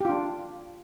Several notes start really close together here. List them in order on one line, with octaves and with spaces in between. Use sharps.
G4 F4 D4